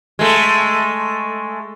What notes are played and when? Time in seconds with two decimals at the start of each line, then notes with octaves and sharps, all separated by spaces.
0.19 G#3 A3